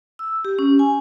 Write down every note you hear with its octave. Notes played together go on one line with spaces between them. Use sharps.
E6
G4
C#4
G#5